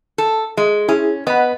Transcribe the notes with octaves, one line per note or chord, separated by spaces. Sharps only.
A4
G#3
C#4 E4 G#4
B3 D#5 F#5 B5